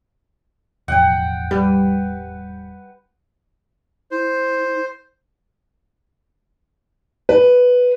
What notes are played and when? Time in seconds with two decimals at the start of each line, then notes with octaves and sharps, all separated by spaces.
0.88 E1 A1 F2 F#5 G5
1.51 G3 B4
4.11 E4 C5
7.29 B4